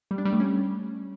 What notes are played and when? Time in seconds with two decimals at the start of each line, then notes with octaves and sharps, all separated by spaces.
0.11 G3
0.18 D4
0.25 G3
0.33 A3
0.40 C#4